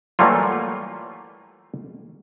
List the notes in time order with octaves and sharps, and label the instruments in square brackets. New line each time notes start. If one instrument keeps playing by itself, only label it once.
[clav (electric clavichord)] E3 F#3 G3 A3 A#3 F4